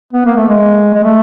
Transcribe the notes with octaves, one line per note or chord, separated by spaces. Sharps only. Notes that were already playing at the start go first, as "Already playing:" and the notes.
B3
A#3
A3
G#3
G#3
A3